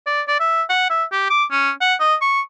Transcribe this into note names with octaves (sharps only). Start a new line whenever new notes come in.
D5
D5
E5
F#5
E5
G4
D6
C#4
F#5
D#5
C#6